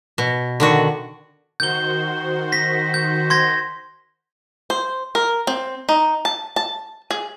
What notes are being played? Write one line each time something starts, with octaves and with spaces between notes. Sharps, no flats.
B2
D3 D#3 F#4
D#3 F#4 C5 G6 G7
A#6 B6
G6
C6 G#6 A#6
C5
A#4
C4
D#4
A5
A5
G#4